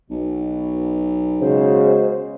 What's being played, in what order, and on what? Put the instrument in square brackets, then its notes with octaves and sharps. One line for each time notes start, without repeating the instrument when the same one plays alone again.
[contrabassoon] B1 [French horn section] B2
[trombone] C#3 [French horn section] G#3 F#4 [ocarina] C5